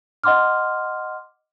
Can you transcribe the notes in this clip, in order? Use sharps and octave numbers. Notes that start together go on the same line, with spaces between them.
D#5 F#5 C6 D6 F6